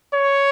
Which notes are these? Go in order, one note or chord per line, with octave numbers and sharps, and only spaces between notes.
C#5